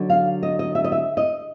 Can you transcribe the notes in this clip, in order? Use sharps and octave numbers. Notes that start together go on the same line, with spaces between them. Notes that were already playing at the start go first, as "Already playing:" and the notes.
Already playing: D3 F#3 D#4
F5
D#5
D#5
E5
D#5
E5
D#5